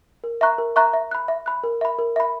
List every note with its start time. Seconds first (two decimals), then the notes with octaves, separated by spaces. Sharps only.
0.24 A#4
0.41 E5 A#5 C#6 F#6
0.58 A#4
0.76 E5 A#5 C#6 F#6
0.93 E5
1.11 B5 F#6
1.28 E5
1.46 B5 F#6
1.64 A#4
1.81 E5 B5
1.99 A#4
2.16 E5 B5